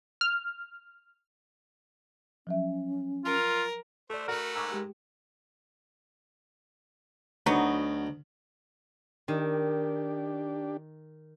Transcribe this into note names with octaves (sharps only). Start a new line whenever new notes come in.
F6
F3 F#3 C#4 E5
F4 A#4
A3 A4 C5 D5
A3 F#4 A#4 B4 F#5
G#2 C#6 D6 E6
G#3 G4
D2 F#3 B3 D#4
D#3 D4 G4